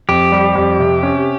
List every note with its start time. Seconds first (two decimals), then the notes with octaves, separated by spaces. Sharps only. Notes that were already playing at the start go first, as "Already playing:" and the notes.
0.09 F2 G4
0.32 G3
0.56 F2
0.79 C3
1.03 C#4